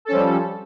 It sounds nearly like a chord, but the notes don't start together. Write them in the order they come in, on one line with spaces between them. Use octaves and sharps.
A4 C#4 F3 G3